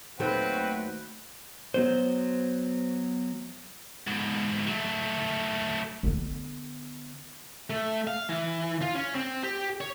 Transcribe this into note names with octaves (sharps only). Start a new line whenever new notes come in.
D#2 F#3 A3 C4 F#4 B4
F#3 B3 C5
G#2 B2
F#3 A3
D3 B3
A3
F5
E3
F4
C#4
C4
G4
C#5